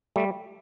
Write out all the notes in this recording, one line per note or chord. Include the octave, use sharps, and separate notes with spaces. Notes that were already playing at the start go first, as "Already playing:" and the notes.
G3 A3